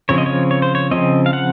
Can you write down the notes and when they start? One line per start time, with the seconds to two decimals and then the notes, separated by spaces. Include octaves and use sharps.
0.09 C#3 F3 C4 C#5
0.18 D#5
0.26 C#5
0.51 C#5
0.62 C5
0.75 C#5
0.91 C#3 F3 C4 D#5
1.26 F5
1.33 F#5